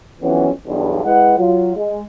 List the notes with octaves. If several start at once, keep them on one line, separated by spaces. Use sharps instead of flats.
F2 E3 F#3 B3 C#4
B1 E2 G2
G#3 E4 B4 F#5
F#3 F4
G#3